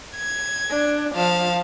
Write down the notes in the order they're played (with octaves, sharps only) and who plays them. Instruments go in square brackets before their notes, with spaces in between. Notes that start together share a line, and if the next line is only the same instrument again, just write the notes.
[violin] G#6
[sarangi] D4
[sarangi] F3 [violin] F5 A5